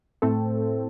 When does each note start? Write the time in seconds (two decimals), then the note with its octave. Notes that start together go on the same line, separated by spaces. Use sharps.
0.22 A2 A3 C4 A4